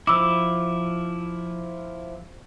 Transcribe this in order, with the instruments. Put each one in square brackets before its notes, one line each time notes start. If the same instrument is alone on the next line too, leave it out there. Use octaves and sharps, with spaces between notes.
[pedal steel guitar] F3 E4 [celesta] D6 E6